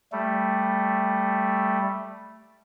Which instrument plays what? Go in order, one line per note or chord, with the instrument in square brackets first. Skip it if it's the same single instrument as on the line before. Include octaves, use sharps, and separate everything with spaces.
[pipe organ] G3 A3